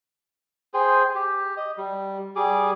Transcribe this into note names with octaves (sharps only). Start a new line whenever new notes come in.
G#4 C5 G5
G4
D#5
G3
G3 G#4 D6